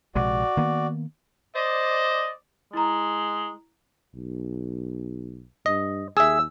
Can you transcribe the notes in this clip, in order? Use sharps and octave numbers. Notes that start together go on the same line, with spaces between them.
A#1 C3 G#3 F#4 D5
D#3 A#3 B3
C5 D5 D#5
G#3 E4 A#5
B1
G2 D#5
D#2 G#4 E5 E6